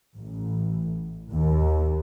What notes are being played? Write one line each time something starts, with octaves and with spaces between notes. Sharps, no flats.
A1
D#2